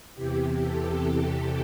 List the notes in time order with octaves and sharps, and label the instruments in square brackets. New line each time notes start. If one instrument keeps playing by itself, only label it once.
[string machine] E2 C3 E3 G4
A4